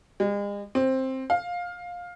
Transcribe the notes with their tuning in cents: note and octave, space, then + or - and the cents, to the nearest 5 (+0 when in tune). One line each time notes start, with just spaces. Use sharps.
G#3 -40
C4 +10
F5 +15